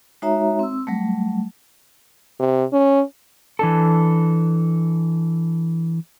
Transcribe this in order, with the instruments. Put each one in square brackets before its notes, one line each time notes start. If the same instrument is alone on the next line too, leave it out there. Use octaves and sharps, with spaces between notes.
[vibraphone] G#3 D#4 F#4 C#5 E5 A#5
C4 E6
F#3 G3 A3
[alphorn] C3
C#4
[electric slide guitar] E3 D4 A4